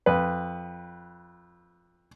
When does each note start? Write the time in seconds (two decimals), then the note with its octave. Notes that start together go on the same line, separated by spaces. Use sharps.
0.06 F2 B4